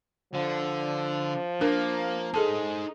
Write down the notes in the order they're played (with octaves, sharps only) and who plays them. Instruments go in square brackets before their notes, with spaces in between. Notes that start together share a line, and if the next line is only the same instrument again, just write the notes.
[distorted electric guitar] D3 [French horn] F3
[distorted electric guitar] A#3 [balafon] D4 A#4
[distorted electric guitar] D#4 C5 [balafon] G#4 A4 A5